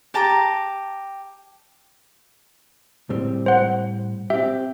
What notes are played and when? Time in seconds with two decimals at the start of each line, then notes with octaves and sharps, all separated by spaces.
0.14 G4 A5 A#5 D6
3.10 A2 G3 C4
3.46 C5 F#5
4.30 C4 G4 E5